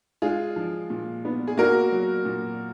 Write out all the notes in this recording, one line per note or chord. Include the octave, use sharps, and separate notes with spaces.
G#3 F4 G#4
F3
A#2
B3
G#4
A#3 F#4 A#4
F#3
A#2